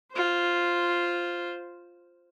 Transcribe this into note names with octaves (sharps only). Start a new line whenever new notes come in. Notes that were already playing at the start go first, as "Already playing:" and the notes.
F4 C5